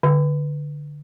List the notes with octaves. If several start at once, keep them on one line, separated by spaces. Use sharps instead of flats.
D3